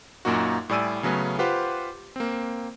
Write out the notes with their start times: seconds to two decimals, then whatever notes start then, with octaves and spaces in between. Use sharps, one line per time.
0.25 F#2 A#2 A#3 D#4 F#4
0.69 A2 G3 D5 G#5 E6 D#7
1.03 C#3 F#3 A3 B3 C#4
1.39 F4 G4 B4 C5 F#5 C6
2.16 A#3 C4